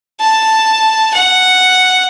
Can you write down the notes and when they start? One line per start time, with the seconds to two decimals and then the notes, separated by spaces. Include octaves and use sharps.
0.20 A5
1.14 F#5